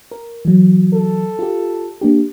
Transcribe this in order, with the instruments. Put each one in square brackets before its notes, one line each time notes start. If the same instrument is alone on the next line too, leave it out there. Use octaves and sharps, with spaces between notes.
[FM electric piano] A#4
E3 F#3
[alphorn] A4
[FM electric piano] F4 G4
A#3 D4 G4